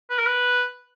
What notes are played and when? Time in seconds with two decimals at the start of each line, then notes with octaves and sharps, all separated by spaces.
0.10 B4
0.18 A#4
0.26 B4